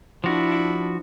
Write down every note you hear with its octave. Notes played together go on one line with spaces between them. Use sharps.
F3 D4 E4 F#4